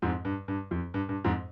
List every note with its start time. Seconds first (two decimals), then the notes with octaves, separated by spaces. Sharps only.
0.02 F2 G#2
0.25 G2
0.48 G2
0.71 F2
0.94 G2
1.09 G2
1.24 F2 G#2